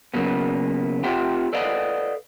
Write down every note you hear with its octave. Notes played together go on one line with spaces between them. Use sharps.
C#3 F#3 A#3 B3
C4 F4 G4 E5 F#5 G5
A4 B4 D5 D#5 F5 F#5